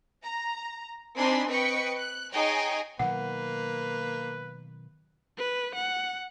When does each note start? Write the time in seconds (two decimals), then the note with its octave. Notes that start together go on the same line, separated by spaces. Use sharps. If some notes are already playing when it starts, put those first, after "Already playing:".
0.23 A#5
1.17 C4 D4 D#4 G#5 B5 C6
1.48 C4 B4 D#5 G5 C#6 C#7
1.96 F#6
2.34 D#4 G#4 C#5 D#5 G5 G#5
2.99 B2 D#3 F#3 A#3 B4 F#5
5.38 B4
5.74 F#5